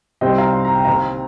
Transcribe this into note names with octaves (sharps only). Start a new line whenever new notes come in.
C2 C3 D#3 G3 C4 D#5 G5
F5 A#5
C6
A#5
G5
D#2 D#3 C4 F5 A#5